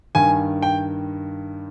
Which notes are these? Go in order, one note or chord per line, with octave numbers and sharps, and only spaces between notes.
G2 D#3 G#5
G5